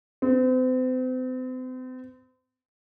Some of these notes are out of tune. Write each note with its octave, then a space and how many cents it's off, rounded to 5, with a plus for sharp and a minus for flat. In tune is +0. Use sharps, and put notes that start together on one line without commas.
C4 -40